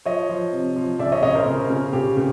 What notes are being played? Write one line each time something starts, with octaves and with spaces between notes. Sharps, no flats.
F3 C#5 D#5
F3
C3
F3
C#3 D5 E5
C#5 D#5
C#3 C#5 D#5
A#4 C5
C#3
C#3
C#3 G4
C#3